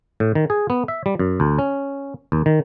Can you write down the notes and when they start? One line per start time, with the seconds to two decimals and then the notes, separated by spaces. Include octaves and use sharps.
0.20 A2
0.35 D#3
0.50 G#4
0.70 B3
0.88 E5
1.06 G3
1.19 F#2
1.40 D2
1.59 C#4
2.32 D#2
2.46 D#3